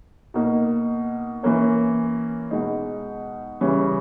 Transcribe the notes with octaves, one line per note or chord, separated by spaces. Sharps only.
B2 A#3 D#4
E3 A#3 C#4
B2 G#3 D#4
C#3 E3 G3 C#4